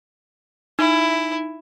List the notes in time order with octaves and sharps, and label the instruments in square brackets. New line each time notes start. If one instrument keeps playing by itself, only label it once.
[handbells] D#4 [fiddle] E4